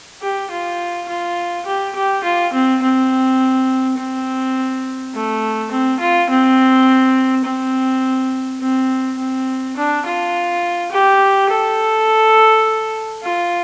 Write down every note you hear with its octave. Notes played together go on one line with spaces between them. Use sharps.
G4
F4
F4
G4
G4
F4
C4
C4
C4
A3
C4
F4
C4
C4
C4
C4
D4
F4
G4
A4
F4